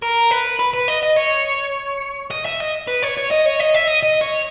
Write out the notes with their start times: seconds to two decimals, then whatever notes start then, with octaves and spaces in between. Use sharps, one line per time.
0.02 A#4
0.31 B4
0.59 B4
0.73 B4
0.88 D#5
1.03 D#5
1.17 C#5
2.31 D#5
2.45 E5
2.60 D#5
2.87 B4
3.02 C#5
3.17 C#5
3.31 D#5
3.46 C#5
3.59 D#5
3.74 E5
3.88 D#5
4.03 D#5
4.21 C#5